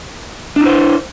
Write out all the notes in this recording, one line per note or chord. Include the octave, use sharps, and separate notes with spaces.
D4 E4 C5